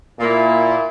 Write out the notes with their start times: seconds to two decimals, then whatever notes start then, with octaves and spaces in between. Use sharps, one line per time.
0.18 A#2 A#3 E4